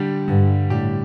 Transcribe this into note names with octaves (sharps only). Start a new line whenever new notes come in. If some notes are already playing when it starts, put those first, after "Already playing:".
Already playing: D3 G3 D4 G4
G2 D3
A2 G3 D4 G4